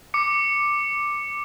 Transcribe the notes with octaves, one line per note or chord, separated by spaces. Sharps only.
D6 C#7